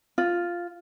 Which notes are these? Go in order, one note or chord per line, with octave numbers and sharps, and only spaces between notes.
F4